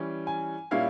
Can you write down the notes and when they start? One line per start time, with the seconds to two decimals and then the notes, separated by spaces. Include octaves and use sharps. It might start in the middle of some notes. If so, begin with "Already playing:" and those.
Already playing: E3 G3 C#4
0.27 G#5
0.71 A#2 G3 C#4 E4 F5